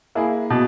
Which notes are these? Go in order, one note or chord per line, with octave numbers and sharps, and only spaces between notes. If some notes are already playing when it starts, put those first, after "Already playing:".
A#3 E4 G#4
B2